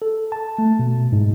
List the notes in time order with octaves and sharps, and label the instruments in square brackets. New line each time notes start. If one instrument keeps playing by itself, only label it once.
[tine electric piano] A4
A5
A3
B2
G#2